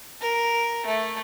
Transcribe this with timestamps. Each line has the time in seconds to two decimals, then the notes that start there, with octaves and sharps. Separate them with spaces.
0.21 A#4
0.86 A3